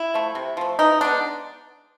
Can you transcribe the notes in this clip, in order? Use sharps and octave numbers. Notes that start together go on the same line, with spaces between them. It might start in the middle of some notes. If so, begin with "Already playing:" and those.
Already playing: E4
F3 A3
C3
F3 A3
E3 D#4
G#3 B3 D4